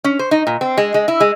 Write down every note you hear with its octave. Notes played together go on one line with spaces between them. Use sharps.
C#4
C5
D#4
A#2
C4
G#3
G#3
E4
G#3